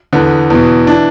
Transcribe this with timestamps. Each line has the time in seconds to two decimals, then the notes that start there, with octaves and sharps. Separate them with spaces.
0.13 E2 D3 B3
0.50 E2 B2
0.87 E3 D4